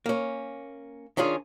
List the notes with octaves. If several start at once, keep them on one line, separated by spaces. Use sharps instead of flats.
A#3 C#4
D#3 C#4 D4 F4 G#4